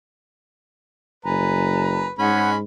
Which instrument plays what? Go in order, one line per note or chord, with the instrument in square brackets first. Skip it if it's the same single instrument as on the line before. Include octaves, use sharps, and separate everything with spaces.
[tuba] F#1 [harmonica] B4 [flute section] G#5 A#5
[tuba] G#2 [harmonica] G#3 C#4 B5 [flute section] D#4 C#5 F#5